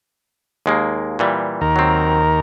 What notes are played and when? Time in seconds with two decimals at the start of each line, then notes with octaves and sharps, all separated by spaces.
0.66 D#2 G#3 A#3
1.19 A#2 E3 G3
1.61 D#2 A#4
1.76 F#3 C4